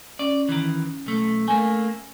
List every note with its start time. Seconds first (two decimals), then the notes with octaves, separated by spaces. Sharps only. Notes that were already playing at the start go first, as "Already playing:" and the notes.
0.19 C#4 D5
0.49 D#3 E3
1.06 B1 A3
1.48 A3 A#3 G#5